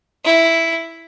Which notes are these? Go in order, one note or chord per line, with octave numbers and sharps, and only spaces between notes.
E4